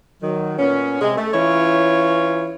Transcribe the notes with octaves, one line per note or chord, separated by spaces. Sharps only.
D#3 F#3
A#2 B3 C#4
C3 G#3
A3
E3 C#4 E4 F4 C#5